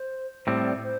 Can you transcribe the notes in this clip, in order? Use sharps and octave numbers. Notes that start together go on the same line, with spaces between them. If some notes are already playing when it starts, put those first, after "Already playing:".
Already playing: C5
A2 G3 C4 D5
C5